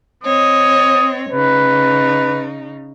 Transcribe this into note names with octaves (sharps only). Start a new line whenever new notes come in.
C4 C#5 D#5 D#6
C#3 D#4 B4